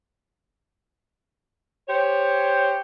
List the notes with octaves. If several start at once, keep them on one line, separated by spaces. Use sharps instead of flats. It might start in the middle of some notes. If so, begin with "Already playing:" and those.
G4 C5 C#5